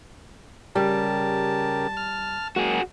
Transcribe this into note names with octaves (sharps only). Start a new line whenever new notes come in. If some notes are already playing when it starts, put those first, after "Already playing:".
C#3 G3 G4 A#4 A5
F6
F#3 G#3 A#3 F#4 G#4